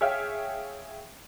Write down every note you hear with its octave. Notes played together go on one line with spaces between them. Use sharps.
G#4 C#5 E5 F5 G5 F6